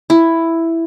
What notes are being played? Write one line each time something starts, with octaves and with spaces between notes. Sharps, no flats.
E4